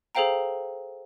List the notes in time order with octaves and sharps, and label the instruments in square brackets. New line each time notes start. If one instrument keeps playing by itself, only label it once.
[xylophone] G#4 A4 C5 F5 G5 A#5